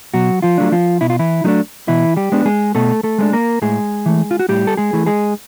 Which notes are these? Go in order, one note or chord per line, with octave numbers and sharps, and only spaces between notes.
B2 F#3 F#4
F3 F4
F#3 A3 D4
F3 F4
B2 E4
F4
E3 E4
F#3 A3 D4 D#4
B2 E3 E4
G3 G4
G#3 B3 D4
G#3 G#4
B2 A3 A4
A3 A4
G#3 B3 D4
A#3 A#4
A2 G#3 G#4
E3 A3
F4
F#4
A2 G3 G4
A4
G#3 G#4
E3 A3
G#3 G#4